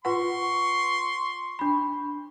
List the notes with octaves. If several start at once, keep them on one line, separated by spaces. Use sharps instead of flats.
F4 B4 F#5 C6 C#6
D4 B5